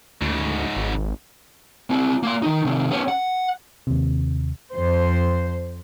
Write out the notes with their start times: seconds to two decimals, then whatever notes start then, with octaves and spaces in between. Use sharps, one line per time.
0.22 D2 G#2 C#3
0.77 G#1
1.90 C4 E4
2.23 A#3 C6
2.42 D#3 D#4
2.65 C3 D#3
2.90 B3 C#4
3.08 F#5
3.87 D#2 C3
4.75 F2 C5